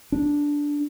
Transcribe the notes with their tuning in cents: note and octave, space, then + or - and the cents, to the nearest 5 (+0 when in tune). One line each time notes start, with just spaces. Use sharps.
D4 -10